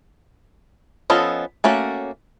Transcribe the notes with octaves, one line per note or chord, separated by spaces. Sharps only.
F3 B3 C#4 A4 D#5
A3 A#3 C#4 F#4